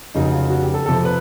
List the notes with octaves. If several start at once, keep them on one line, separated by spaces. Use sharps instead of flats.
F1 F2 C#3 F#3 D#4
F4
F#4
G4
A4
F2 C3 F3 A4
B4